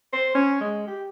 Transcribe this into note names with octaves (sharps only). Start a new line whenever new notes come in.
C5
C#4
G#3
G4